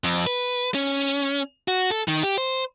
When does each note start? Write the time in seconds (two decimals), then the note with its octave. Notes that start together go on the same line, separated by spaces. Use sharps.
0.04 F2
0.27 B4
0.74 C#4
1.68 F#4
1.90 A4
2.08 D#3
2.23 G4
2.38 C5